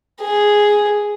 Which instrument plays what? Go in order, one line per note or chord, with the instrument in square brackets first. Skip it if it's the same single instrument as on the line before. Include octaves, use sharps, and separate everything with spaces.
[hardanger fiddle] G#4